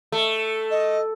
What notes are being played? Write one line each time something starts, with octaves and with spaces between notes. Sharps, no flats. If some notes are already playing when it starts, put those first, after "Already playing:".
A3
D#5